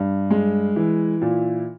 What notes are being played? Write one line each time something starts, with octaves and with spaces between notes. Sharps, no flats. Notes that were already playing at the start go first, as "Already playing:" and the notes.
Already playing: G2
G#3
E3
A#2